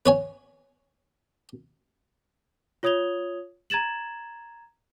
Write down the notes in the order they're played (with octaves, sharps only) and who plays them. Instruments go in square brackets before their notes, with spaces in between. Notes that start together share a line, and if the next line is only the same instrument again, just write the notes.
[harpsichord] B4 C#5 G#5
[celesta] F4 C#5 D#6 G#6 F7 G7
A#5 G#6 A6 E7 F#7